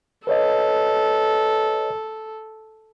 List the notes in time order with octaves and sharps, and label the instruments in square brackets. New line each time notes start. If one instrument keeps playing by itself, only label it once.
[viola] A4 [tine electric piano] B4 C#5 D#5